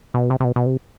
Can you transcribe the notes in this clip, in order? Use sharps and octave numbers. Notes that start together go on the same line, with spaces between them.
B2
C3
C3
B2
B2
C3